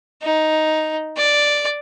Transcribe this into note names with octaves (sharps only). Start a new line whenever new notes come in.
D#4
D5